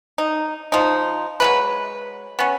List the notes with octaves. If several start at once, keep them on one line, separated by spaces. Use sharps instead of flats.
D#4
F3 D#4
F#3 G#3 B4
B3 C#4